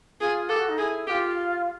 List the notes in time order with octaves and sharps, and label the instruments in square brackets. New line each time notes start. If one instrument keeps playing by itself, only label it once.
[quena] F4 [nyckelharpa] G#4
[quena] G4 [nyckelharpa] A4
[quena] F#4
D#4
[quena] E4 [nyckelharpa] G#4
[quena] F#4 [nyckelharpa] G4
[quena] F4